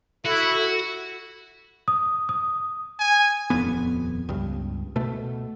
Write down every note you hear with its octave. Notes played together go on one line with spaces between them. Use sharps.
E4 F#4 A4
D#6
D#6
G#5
D#1 F2 B3
C#2 G2
B2 A3